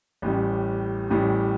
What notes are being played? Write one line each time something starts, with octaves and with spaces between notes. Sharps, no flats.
A1 A2 G3
A1 A2 G3